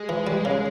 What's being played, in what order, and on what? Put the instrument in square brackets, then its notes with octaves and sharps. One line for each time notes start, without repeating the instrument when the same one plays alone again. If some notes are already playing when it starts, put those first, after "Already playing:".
Already playing: [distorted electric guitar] G#3
[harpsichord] E3
G3
C#3